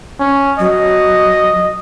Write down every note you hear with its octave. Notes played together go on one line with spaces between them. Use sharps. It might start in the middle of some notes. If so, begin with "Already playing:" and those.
C#4
F#3 D#5